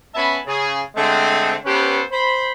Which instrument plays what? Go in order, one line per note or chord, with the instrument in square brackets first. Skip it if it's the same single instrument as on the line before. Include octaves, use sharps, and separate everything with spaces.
[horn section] B3 C#4 E5 G#5 A5 B5
C#3 G#4
D3 G#3 A3 C4
B3 C#4 G4 A4 B4 C5
C5 B5